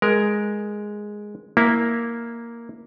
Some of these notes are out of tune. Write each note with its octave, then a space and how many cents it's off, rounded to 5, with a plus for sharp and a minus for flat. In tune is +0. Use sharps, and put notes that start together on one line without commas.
G#3 +0 A#4 +10
A#3 +0 E4 -5